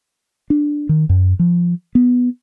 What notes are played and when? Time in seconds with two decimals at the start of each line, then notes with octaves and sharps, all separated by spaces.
0.50 D4
0.89 D#3
1.09 F#2
1.39 F3
1.95 B3